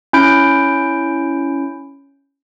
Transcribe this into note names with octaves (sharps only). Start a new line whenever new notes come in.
C#4 E4 G6 D7